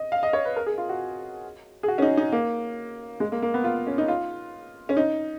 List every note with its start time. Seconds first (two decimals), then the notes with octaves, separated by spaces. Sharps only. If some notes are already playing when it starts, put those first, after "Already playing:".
Already playing: D#5
0.12 F5
0.23 D#5
0.33 C#5
0.45 B4
0.56 A#4
0.66 G#4
0.78 F4
0.89 F#4
1.83 G#4
1.88 F#4
1.98 C#4
2.02 D#4
2.17 D#4
2.32 A#3
3.20 G#3
3.32 A#3
3.42 A#3
3.54 B3
3.64 F4
3.87 C#4
3.98 D#4
4.08 F4
4.89 C#4
4.97 D#4